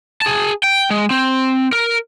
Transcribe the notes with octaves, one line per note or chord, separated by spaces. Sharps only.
G#4 A5
G5
G#3
C4
A#4